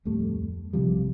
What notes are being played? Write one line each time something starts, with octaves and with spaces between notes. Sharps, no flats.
D1 F2 G3 A3
A#1 C3 F3 G3